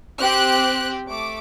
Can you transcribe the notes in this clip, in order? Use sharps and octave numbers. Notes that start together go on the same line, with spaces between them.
C4 G4 F#6
A3 D6